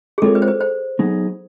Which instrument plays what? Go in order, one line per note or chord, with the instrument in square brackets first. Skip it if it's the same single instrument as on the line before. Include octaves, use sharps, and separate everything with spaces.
[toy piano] G#4
[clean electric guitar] G#3 C4 F4 A#4 C#5 [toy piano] A4
[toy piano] B4
C5
B4
C5
[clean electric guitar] F#3 B3 D#4 G#4